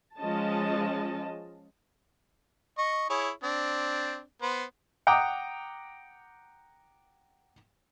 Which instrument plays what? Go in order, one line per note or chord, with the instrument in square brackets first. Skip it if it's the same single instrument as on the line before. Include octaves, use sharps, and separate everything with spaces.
[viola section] F3 G#3 C#4 D#5 A5
[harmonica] D#5 C#6
E4 G#4 C#5
C4 D4
B3 C5
[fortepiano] F#5 G5 A#5 D6 D#6